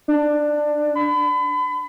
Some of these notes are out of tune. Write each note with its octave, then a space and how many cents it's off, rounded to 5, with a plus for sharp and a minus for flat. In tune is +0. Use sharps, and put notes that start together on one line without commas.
D4 +15
B5 +35